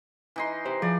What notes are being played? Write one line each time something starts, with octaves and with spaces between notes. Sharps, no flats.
E3 D#4 C6
G4 C5
F3 G#4 D5